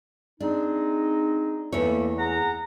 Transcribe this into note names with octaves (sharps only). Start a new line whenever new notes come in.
G#3 C4 D4 D#4
E2 A3 A#3 E4 C#5
G#4 F#5 A#5